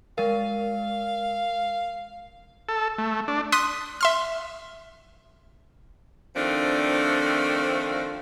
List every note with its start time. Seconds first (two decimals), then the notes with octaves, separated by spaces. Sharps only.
0.18 G#3 A#4 F5
2.69 A4
2.98 A3
3.28 D4
3.52 C6 D#6 F#6 B6 D#7
4.01 E5 C6 F6
6.35 D#3 F3 A3 C4 D4